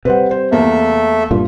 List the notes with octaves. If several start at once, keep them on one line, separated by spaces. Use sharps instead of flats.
C3 G3 B4 C5 F#5
C5
E2 A3 A#3 A4 E5
G2 A#2 F4